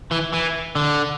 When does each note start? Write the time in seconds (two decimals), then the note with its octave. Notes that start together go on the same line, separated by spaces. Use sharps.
0.11 E3
0.33 E3
0.75 D3